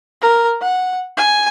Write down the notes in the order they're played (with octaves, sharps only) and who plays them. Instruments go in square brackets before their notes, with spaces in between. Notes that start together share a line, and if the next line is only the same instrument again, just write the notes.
[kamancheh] A#4
F#5
G#5